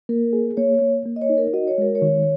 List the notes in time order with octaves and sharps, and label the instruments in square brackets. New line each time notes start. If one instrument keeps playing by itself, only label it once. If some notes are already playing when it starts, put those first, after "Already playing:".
[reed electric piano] A#3 [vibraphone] A#4
[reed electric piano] G#4
[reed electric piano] A#3 [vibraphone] C#5
[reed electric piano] A#3
A#3
[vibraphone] D#5
C#5
[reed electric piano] D#4
[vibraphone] A#4
[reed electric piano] F#4 [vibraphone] D#5
[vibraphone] C#5
[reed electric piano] G#3 [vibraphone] A#4
[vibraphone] C#5
[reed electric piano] D#3